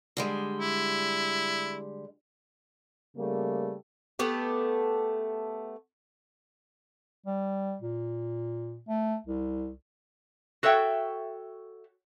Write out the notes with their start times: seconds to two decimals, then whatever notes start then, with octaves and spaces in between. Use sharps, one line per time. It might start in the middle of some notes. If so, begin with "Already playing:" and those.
0.17 D3 G3 G#3
0.61 E4
3.17 C#3 G3 A3 A#3
4.19 A3 B3 G4
7.26 G3
7.82 A#2
8.88 A3
9.27 C2
10.63 F#4 A4 C#5 E5 G5